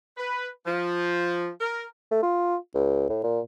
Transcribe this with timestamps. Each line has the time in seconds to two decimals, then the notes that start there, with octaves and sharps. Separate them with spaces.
0.17 B4
0.66 F3
1.60 A#4
2.11 A3
2.23 F4
2.74 C#2
3.09 A2
3.23 A#2